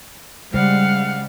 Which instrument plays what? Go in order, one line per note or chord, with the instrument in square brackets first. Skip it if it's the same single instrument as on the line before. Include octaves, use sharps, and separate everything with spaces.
[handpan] C#3 G#3 C5 [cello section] G3 [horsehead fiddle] F5 F#5